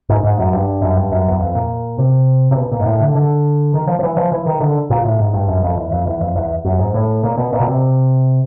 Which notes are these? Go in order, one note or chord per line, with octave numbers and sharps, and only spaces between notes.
G#2
G#2
F#2
G2
F#2
G2
F#2
E2
F2
A#2
C3
C3
B2
A#2
G#2
A2
D3
D3
D#3
F3
F3
E3
F3
E3
D#3
D3
A#2
A2
G#2
G2
F#2
F2
E2
F2
E2
F2
E2
F#2
G#2
A2
A#2
B2
A#2
B2
C3